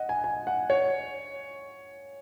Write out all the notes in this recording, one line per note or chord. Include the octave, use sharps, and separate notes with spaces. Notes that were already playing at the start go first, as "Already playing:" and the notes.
Already playing: D#5 F#5
G#5
G#5
F#5
C#5